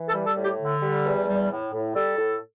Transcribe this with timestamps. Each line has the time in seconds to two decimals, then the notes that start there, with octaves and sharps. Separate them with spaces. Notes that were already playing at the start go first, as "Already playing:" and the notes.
Already playing: E3
0.09 A4
0.14 G3
0.26 A4
0.37 A2
0.43 G4
0.60 D3
0.82 G3
1.05 E2
1.28 G3
1.50 A2
1.72 A2
1.95 G3 A4
2.18 A2